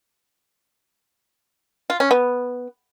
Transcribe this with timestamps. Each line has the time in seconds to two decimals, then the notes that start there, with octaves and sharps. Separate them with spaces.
1.90 F4
2.00 C#4
2.11 B3